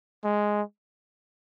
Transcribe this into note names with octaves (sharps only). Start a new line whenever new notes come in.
G#3